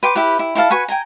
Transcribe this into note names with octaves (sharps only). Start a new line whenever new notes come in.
B4 G5 C6 D6
E4 G4 B4
E4
E4 A4 F5 A5
F#4 B4 G#5 C#6
G5 G#5 A#5